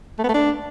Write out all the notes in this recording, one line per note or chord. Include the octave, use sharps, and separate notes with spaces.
A3
B3
A3
D4